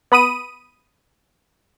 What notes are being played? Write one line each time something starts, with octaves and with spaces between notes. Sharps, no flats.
B3 B5 D#6 D#7